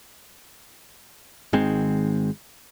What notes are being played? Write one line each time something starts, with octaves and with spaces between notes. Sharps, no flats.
G#1 D#3 G#3 C4